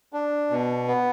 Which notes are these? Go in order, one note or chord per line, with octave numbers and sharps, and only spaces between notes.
D4
B2
B3